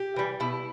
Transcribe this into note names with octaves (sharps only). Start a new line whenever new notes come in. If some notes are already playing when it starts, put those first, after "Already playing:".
Already playing: G4
E3 G3
B2 E4